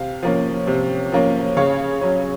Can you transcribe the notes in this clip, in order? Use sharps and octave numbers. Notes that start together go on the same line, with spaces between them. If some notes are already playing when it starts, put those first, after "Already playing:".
Already playing: C3 F5
F3 A#3 C#4
C3
F3 A#3 C#4
C#3 C#5 F5
F#3 C#4